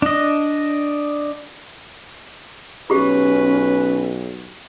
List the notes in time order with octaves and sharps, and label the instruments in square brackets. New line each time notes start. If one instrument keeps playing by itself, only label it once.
[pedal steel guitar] D4 D#5
[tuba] B1 [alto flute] C#4 [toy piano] F4 G4 [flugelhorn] B4